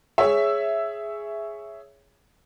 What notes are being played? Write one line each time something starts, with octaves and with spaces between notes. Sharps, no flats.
G#4 C#5 E5